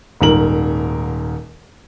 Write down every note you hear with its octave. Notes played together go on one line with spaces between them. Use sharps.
D#1 G#2 A#4 F#7